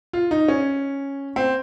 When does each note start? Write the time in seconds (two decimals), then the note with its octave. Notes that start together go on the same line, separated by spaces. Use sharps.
0.13 F4
0.31 D#4
0.48 C#4
1.36 C4